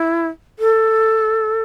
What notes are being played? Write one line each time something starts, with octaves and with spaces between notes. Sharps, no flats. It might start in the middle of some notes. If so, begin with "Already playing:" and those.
Already playing: E4
A4